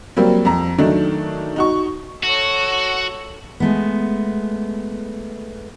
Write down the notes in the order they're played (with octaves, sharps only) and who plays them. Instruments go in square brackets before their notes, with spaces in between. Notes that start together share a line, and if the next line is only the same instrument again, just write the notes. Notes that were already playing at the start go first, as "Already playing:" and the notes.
[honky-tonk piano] F#3 G3 A#3 C4
F2 A#5
D#3 F#3 A3 D4 D#4
D#4 F#4 C#6
[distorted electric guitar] F#4 [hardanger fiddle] A4 C#5
[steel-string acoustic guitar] G#3 A3 B3